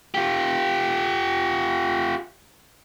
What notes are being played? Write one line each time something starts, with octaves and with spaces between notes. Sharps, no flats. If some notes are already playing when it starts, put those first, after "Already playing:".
F4 G4